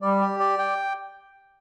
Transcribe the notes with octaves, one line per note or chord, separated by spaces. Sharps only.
G3 D5
G4
D5
G5